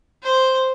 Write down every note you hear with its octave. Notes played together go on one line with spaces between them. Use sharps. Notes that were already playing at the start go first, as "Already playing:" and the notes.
C5